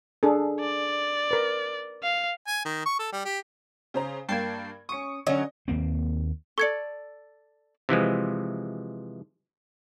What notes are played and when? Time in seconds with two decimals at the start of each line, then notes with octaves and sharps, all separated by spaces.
0.23 D4 G#4 A4
0.60 D5
1.31 A#4 B4
2.03 F5
2.47 G#5
2.66 D#3
2.86 C#6
2.99 A4
3.12 G3
3.25 G4
3.94 C#3 C5 A#5
4.29 G2 A#3 G5 A5 G#6 C7
4.89 C#4 C#6 D#6 C#7
5.27 D3 F#3 C#4 D#5
5.68 D#2 A#3 C4
6.58 A4 D5 C#6 G#6 C#7
7.89 C3 E3 F3 G#3